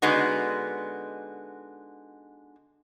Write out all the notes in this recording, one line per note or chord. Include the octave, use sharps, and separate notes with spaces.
D3 G#3 B3 D#4 F#4